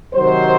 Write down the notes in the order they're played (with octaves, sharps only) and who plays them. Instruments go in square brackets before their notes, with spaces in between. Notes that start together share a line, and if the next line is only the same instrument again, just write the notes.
[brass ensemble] C3 D#3 F#3 C5